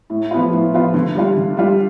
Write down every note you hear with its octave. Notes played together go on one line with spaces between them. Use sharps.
A2
F3 B3 F4
A2
F3 B3 F4
D3
G3 D4 F4
D3
G3 D4 F4